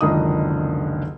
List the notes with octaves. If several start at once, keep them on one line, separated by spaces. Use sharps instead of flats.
F#1 C#2 D3 D#3 D#5 D#6